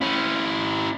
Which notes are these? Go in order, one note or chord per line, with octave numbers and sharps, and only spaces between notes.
C#4 E4